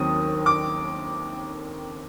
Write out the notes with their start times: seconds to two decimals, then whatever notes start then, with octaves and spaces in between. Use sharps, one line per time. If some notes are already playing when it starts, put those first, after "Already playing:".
Already playing: D#2 D#3 F#3 C4 D#6
0.46 D6